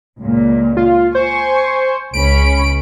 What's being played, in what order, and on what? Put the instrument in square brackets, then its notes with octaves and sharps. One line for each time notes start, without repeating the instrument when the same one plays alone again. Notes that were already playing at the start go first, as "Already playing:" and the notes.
[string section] C#2 A#2
[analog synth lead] F4
[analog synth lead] C5 [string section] G#5 C#6
[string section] C#2 C#4 B5 [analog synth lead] D7